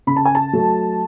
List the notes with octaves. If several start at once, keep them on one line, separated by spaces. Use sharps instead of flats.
C#3 B5
A5
G#5
A5
F#3 A3